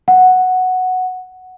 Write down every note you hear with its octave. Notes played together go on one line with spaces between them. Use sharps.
F#5